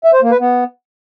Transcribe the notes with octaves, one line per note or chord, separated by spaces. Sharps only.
E5
C5
A#3
B4
B3